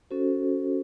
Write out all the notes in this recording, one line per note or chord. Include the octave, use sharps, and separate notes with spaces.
C#4 F#4 A4 C5